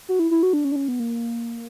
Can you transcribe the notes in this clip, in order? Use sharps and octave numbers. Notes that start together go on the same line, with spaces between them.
F#4
E4
E4
F#4
D4
C#4
D4
C#4
B3
A#3